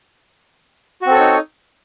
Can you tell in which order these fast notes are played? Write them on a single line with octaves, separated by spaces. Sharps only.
F#4 C4 A4 C#5 D#4